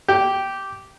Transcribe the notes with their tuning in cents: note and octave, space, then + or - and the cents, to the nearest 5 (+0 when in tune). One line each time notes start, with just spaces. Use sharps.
G4 -10